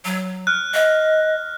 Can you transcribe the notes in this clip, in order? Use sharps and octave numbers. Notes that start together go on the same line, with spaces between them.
F#3
F6 F#6
D#5